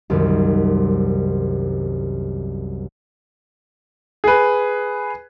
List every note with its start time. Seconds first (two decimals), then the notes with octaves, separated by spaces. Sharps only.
0.10 C2 F#2 D#3
4.24 G#4 B4